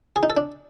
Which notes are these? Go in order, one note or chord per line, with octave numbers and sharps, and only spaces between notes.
G#4
D#4
A4
D4